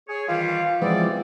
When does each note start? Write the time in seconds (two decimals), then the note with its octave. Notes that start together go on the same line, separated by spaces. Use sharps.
0.09 G#4 C#5
0.29 D#3 E3 G3 F4
0.82 E3 F3 G#3 B3 C4 D5